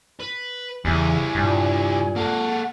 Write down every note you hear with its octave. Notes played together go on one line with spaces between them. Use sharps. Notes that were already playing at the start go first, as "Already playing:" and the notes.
B4
E2 C#3 G3 E4 G#5
G2 A#2
A#3 A4 F#5